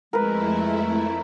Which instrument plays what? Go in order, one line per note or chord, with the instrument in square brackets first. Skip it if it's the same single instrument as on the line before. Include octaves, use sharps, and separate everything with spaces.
[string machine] F2 A3 E4 [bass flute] G#3 [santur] A#4 B4